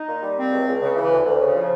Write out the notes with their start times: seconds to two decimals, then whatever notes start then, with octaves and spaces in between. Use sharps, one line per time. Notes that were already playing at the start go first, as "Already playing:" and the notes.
Already playing: D#4
0.09 A#2
0.23 G3
0.38 C4
0.52 C#2
0.68 C#2
0.82 C#3
0.96 E3
1.12 D2
1.26 D2
1.41 C#3
1.55 F3